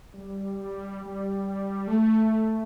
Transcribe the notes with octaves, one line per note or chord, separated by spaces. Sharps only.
G3
G3
A3